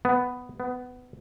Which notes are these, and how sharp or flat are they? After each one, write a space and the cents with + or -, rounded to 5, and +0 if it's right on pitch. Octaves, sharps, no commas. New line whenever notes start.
B3 +5
B3 +15